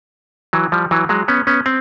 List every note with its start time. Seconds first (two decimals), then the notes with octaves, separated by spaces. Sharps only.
0.53 E3 F#3
0.72 F3 G3
0.91 E3 F#3
1.09 F#3 G#3
1.28 B3 C#4
1.47 B3 C#4
1.66 C4